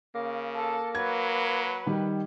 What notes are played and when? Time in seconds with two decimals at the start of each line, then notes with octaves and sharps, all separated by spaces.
0.15 C#3 A#3
0.55 A4
0.95 F#3 B4 G#6
1.86 D#3 G3